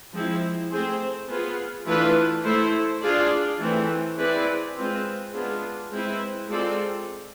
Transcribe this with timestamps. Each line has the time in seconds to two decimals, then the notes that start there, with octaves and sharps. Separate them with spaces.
0.13 F3 G#3 C4 E4
0.71 A3 C4 G#4 C5
1.28 B3 F4 G#4
1.86 E3 A3 D4 F4 B4
2.43 A3 E4 A4 C5
3.01 D4 F4 G#4 D5
3.59 E3 A3 C4
4.17 C4 E4 G#4 B4 D5
4.75 G#3 C4 F4 B4
5.33 G#3 B3 D4 F4 G#4
5.90 G#3 C4 E4 B4
6.48 G#3 C4 F4 A4 D5